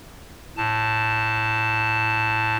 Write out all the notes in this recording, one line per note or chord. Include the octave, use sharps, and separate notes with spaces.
A2 A5